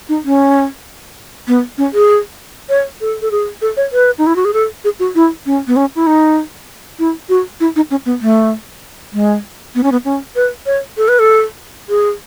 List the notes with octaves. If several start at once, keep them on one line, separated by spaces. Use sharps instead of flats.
D#4
C#4
B3
C#4
G#4
C#5
A4
A4
G#4
A4
C#5
B4
D#4
E4
F#4
G#4
A4
G#4
F#4
E4
C#4
B3
C#4
E4
D#4
E4
F#4
E4
D#4
C#4
B3
A3
G#3
B3
C#4
B3
C#4
B4
C#5
A4
B4
A4
G#4